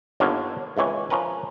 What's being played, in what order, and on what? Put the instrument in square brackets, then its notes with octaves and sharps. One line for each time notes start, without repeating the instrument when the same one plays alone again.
[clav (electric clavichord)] G1 D#2 D3 B3 C#5 F5
G#1 C#2 E3 C#5
F3 C#4 A#4 B4